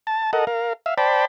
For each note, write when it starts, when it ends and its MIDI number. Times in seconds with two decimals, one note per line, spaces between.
0.07 0.31 81
0.33 0.45 69
0.33 0.45 70
0.33 0.45 75
0.33 0.45 78
0.47 0.73 70
0.47 0.73 77
0.86 0.94 76
0.86 0.94 77
0.98 1.25 72
0.98 1.25 74
0.98 1.25 79
0.98 1.25 81
0.98 1.25 83